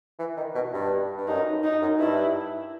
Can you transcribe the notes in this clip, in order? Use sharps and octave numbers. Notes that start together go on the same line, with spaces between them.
E3
D#3
B2
G2
G2
F#2 D#4
D#4
F#2
G2 E4